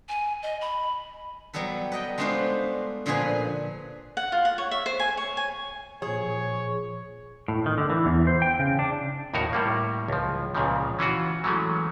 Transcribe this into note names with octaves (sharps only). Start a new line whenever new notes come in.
G#5
D#5
B5
F#3 G3 B3 A4 B4
B4 D#5 G5
G#3 A3 B3 D4 F4 C5
A#2 D3 F3 G#4 B4 G#5
F#5
F4
F#5
C#5
E5
C5
G#5
C#5
G#5
A#2 F3 G#4 C#5
A2
D#3
D3
E3
E2
C5
G5
C#3
D4
D#2 A2 D#4 F#4 A#4 C#5
A2 G3 A#3
C#2 F3
C#2 A#2 C#3 F3
E3 C#4 F4 F#4
E3 F#3 G#3 A3 C#4